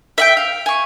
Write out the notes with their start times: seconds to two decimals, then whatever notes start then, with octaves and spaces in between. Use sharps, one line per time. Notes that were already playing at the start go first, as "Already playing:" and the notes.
0.18 E5 F#5 G5
0.37 F5
0.66 G#5 C#6